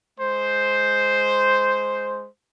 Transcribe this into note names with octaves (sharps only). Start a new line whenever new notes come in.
G#3 C5